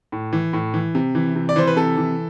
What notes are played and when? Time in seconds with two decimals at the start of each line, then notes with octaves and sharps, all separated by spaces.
0.12 A2
0.33 E3
0.53 A2
0.74 E3
0.95 C3
1.15 E3
1.35 C3
1.49 D5
1.56 E3 C5
1.67 B4
1.76 C3 A4
1.98 E3